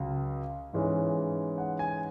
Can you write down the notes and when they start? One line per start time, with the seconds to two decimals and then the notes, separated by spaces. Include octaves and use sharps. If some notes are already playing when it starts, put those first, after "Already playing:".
Already playing: C#2 C#3 F#3
0.73 G#2 E3 G#3 C#4
1.58 F#5
1.79 G#5